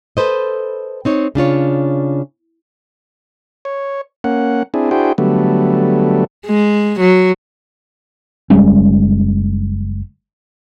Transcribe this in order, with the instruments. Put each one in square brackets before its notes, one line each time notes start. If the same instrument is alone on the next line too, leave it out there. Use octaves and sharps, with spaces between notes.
[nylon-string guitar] A4 B4 C5 D#5
C4 D#4 C#5
C#3 D4 F4 C#5
[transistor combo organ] C#5
A#3 C#4 F#5
C4 D4 E4 G#4
D4 E4 F#4 G#4 C5 G5
D3 F#3 G3 A3 B3
[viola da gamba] G#3
F#3
[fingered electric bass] F#1 G3 G#3 C#4